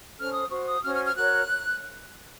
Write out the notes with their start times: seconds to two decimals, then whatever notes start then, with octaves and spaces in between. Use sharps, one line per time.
0.18 C#4 A4 C5 F6
0.34 D#6
0.50 F#4 C5 C#6
0.67 D#6
0.83 C#4 F#4 C5 F6
0.94 F6
1.05 F6
1.16 F#4 A#4 C#5 F#6